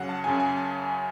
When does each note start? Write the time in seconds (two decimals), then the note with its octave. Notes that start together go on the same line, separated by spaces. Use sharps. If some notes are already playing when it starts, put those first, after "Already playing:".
Already playing: F#2 C#3 F#3 F5 F#5
0.09 A5
0.24 F#2 C#3 F#3 G#5
0.40 G#5
0.57 A5